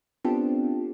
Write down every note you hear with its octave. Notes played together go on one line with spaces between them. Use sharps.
B3 C4 D4 F4 G4 A4